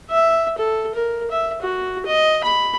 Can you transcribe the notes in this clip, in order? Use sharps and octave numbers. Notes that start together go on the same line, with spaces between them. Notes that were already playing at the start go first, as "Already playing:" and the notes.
E5
A4
A#4
E5
F#4
D#5
B5